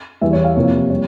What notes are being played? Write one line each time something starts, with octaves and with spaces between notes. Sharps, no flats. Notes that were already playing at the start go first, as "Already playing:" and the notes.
E2 E3 G3 E5
C#5
F5
F2 C3 E3 A#3 C#5
G3 C#5